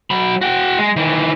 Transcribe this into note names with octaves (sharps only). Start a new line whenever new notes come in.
F#3 B5
F#4 G5
G#3
D#3 E3